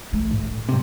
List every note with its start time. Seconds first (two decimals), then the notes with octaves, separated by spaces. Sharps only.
0.13 A3
0.31 A2
0.69 G2 C3